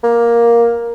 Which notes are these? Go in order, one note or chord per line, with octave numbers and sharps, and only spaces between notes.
A#3